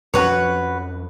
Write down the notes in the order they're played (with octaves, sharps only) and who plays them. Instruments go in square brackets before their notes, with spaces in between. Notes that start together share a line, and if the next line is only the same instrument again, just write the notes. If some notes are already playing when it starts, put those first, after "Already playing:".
[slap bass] F2 F3 C#4 [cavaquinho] F#4 B4 C#5